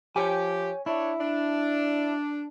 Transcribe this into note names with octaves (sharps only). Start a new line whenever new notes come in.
F3 G4 C#5 G#5
D4 E4 C#5
D4